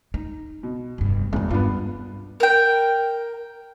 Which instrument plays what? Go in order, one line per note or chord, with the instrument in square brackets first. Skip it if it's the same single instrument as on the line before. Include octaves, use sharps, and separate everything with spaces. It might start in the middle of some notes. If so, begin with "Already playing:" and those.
[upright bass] D#4
[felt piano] B2
[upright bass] F1 G2
[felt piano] E1 E2 [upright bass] C4 E4
[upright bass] G2 [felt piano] B3 D4 F4
[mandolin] A#4 G5